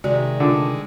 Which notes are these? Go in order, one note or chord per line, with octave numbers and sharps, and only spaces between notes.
C3 D#3 G#3 F#4 D5
D3